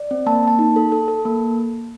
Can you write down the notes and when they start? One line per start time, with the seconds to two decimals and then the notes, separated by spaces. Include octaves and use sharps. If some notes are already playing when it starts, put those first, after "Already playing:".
Already playing: D5
0.11 C4
0.26 A#3 A5
0.44 A#3 A5
0.59 D#4
0.76 A4
0.92 A4
1.08 A4
1.25 A#3